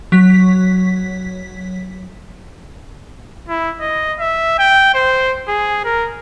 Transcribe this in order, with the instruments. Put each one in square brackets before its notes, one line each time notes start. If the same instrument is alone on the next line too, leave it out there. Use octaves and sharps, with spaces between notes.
[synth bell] F#3 B6
[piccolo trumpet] E4
D#5
E5
G5
C5
G#4
A#4